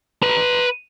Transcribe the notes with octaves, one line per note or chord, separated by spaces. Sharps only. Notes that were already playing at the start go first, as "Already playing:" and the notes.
B4 A#5